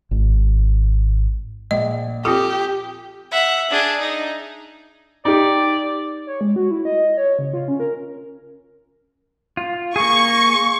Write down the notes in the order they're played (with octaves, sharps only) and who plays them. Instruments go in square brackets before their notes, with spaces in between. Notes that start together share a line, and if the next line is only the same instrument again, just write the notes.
[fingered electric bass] G#1
[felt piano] A#1 [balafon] D#5
[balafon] C4 F4 A4 [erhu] G4 [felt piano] D6 D#6
[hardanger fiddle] E5 F#5
D4 G#4
D#4
[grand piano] D#4 G4 [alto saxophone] D5
[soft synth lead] C#5
G#3
F#4
E4
D#5
C#5
C#3
F4
C#4
A#4
[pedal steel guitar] F4
[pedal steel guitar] A#3 G#4 [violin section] C#6